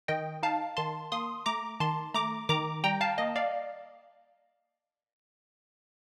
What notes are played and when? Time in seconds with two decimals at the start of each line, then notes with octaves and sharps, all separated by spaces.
0.08 D#3 D#5 G5
0.43 D#4 F5 A5
0.77 D#3 A5 C6
1.12 A#3 C6 D#6
1.46 A3 A#5 D6
1.80 D#3 A5 C6
2.14 A3 A#5 D6
2.49 D#3 A#5 D6
2.84 G3 G5 A#5
3.01 F5 A5
3.18 A#3 D#5
3.36 D5 F5